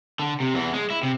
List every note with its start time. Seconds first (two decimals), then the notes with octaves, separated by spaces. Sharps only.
0.19 D3
0.40 C3
0.54 E2 E3
0.74 G#3
0.90 E4
1.03 C3